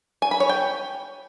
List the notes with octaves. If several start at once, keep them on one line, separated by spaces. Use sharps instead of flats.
G#5
B5
C#5
G5